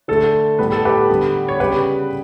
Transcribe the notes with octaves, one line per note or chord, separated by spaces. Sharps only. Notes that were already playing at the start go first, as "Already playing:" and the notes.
D3 A3 A4
A2 G3 B3 B4
A4
G4 B4
D3 G3 B3
C#5
C#3 G3 B3 G4 B4